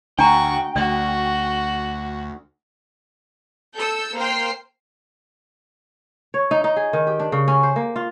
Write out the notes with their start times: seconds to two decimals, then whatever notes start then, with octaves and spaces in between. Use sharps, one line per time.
0.19 D2 D4 F#4 G5 A#5 C#6
0.76 D2 F#4 D5
3.77 A4 E6 G6 C#7
4.17 A#3 C5 G5 C6 F6 C7
6.34 C#5
6.51 D#4
6.64 D#4
6.76 G#4
6.93 D#3
7.07 G4
7.20 D4
7.32 C#3
7.48 C#4
7.63 C5
7.76 A#3
7.96 F4